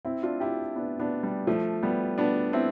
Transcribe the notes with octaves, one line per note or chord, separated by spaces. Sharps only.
C4 E4
D4 F4
E4 G4
B3 D4
B3 D4
G3
F3 A3
G3 B3
B3 D4
C4 E4